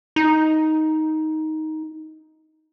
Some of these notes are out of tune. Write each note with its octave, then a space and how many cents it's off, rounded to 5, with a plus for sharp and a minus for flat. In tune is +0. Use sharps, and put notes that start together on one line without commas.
D#4 +10